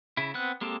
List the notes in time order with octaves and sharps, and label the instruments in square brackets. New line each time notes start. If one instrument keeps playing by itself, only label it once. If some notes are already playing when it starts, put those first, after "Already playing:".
[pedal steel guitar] C#3 E4
B3 C4 F#6
G#3 A#3 C4 G4 A4